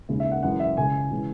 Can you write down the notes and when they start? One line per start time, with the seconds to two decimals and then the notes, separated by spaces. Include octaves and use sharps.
0.09 D#2 C#3 G#3
0.20 E5
0.32 F#5
0.43 F#2 E3 G#3 F#5
0.60 E5
0.77 C#2 C#3 G#3 G#5
1.11 C#3 E3 G#3